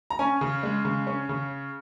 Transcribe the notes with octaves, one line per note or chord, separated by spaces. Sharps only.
A#5
C#4 G#5
C#3
G#3
C#3
C#4
C#3